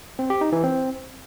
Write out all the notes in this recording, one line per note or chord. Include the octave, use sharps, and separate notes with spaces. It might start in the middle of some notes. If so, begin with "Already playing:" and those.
C4
G4
D#4
E3
C4